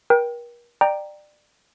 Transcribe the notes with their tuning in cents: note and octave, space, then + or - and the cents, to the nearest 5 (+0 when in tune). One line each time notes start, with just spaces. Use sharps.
A#4 +40 G5 +0
D5 +25 G5 +0 A#5 +0